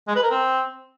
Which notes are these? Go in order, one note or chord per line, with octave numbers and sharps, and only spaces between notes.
G#3
B4
A#4
C4